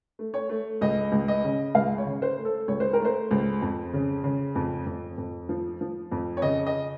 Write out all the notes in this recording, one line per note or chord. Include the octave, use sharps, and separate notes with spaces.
A3
C#5
A3
C#2 D#5
C#2
D#5
C#3
C#2 F5
C#5
C#3
C5
A3
A4
C#2 C#5
C5
A#4
A3 C5
C#2
F2
C#3
C#3
F2
F2
F2
F3
F3
F2
C#5
C#3 D#5
D#5